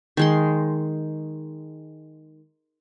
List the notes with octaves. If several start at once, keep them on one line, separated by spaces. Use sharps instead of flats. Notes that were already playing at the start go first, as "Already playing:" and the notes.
D#3 G#3 C6